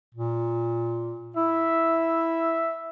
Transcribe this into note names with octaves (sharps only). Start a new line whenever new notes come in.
A#2
E4 E5